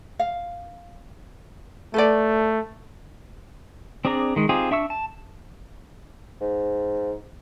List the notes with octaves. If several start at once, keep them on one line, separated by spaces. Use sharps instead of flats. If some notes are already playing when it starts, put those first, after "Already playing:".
F5
A3 A4 B4 D5
C4 D4 G#4 D5 A#5
D#3 G#3
C4 D#4 F4 G4 G#4
D4 E5 C#6 E6
A5
G#2